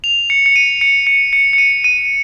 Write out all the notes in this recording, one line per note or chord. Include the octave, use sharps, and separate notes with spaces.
F7
C#7
C#7
D#7
C#7
C#7
C#7
C#7
D#7
D#7